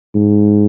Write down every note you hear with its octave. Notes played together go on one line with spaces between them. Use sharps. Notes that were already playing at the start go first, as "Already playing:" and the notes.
G#2